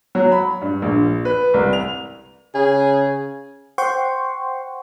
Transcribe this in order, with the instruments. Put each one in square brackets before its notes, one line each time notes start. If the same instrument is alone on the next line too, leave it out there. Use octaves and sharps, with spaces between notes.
[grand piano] F#3
B5
G2
A#1
B4
C2
F7
[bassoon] C#3 [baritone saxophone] G#4
[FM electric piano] C5 F#5 G5 C6 C#6